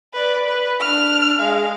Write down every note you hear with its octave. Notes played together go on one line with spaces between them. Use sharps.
B4 D5
B4
D4 F6
G#3 F5